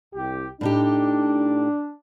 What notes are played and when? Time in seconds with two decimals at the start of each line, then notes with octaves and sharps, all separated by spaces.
0.15 C2 G4
0.61 A2 D4 D#4 G4